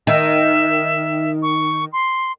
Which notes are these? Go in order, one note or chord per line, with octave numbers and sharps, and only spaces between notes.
D#3 E5
C#6
C6